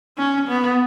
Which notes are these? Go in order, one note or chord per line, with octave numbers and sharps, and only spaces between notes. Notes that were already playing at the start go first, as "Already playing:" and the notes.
C#4
B3